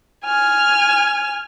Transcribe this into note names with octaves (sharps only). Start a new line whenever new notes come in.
G#5 F6